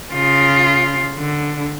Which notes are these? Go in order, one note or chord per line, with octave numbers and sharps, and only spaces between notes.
C#3 F4
D3